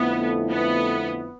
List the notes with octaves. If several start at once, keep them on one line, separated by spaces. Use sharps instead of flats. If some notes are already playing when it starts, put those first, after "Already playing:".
Already playing: F2 D3 A3 B3 E4
B3